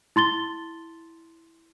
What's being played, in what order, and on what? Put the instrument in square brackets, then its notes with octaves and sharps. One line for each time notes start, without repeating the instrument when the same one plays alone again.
[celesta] E4 C6 A6 G7